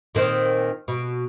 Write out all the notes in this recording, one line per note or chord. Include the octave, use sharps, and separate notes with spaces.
A#2 D#3 C4
B2